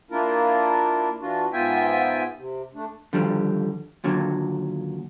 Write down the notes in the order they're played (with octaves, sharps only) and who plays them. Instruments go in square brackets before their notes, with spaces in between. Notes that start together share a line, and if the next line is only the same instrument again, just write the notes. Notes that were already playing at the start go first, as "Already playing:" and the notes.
[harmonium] A#3 D4 E4 F4 A#4
E3 D4 F4 F#4
G#2 B3 F4 E5 G5 G#5
C3
A3 D4
[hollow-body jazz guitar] D3 D#3 F3 G3
D#2 A#2 D3 F#3